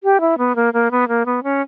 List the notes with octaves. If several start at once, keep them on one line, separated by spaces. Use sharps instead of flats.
G4
E4
B3
A#3
A#3
B3
A#3
B3
C#4